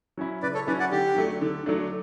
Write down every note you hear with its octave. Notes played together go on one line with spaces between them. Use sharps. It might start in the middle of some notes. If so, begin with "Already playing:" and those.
F#3 C#4 E4
C#3 B4 D5
A4 C#5
F#3 C#4 E4 B4 D5
D5 F#5
D3 G4
F#3 A3 D4
D3
F#3 A3 D4